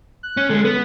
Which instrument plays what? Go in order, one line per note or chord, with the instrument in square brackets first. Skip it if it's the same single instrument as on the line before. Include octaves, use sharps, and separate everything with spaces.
[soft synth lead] F#6
[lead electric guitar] C#4
[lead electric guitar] D2 G#3 [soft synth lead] A4
[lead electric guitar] B3 [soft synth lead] B4